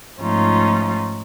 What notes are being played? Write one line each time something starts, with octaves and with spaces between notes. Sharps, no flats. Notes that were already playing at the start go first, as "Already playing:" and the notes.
G#2 F3 A3 C#4 D#4 F4